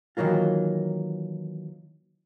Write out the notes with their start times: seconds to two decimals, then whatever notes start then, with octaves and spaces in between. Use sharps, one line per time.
0.17 D#3 E3 F#3 A#3 F4